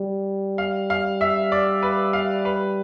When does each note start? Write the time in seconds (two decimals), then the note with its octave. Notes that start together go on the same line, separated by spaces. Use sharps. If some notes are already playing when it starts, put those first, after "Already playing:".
Already playing: G3
0.58 F5
0.90 F5
1.21 E5
1.52 D5
1.83 B4
2.13 F5
2.45 B4